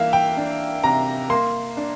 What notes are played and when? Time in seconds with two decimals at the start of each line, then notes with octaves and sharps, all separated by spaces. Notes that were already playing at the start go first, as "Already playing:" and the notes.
Already playing: E3 A#3 E5 F5
0.13 G5
0.37 D4
0.84 C3 A#5
1.30 A#3 C6
1.77 D4